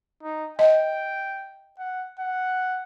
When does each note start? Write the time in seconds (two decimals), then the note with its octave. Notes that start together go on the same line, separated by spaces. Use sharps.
0.23 D#4
0.59 D#5 G5
1.78 F#5
2.19 F#5